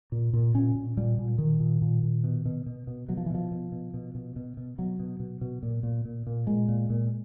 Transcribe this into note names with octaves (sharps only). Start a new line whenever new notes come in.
A#2
A#2
A#2 C#4
A#2
A#2 G3
A#2
A#2 D#3
A#2
A#2
A#2
B2
B2
B2
B2
B2 F#3
F3
E3
B2 F3
B2
B2
B2
B2
B2
B2
B2 F#3
B2
B2
B2
A#2
A#2
A#2
A#2
A#2 G#3
A#2
A#2